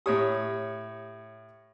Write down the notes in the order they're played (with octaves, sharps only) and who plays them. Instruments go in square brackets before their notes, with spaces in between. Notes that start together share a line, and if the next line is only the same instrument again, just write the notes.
[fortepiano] A2 C#5 D#6 [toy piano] G4 A#5 C#6